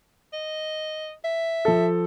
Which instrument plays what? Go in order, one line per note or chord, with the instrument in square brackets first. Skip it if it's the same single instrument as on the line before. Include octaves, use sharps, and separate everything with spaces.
[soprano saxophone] D#5
E5
[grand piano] F3 A4